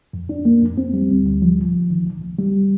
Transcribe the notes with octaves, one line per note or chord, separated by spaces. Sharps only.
F2
D4
A#3
F2
C4
G3
D2
D2
F3
C2
C2
D#3
C2
C2
G3